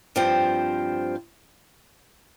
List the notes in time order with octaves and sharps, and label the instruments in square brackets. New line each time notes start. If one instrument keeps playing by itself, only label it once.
[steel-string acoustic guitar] G2 F3 C4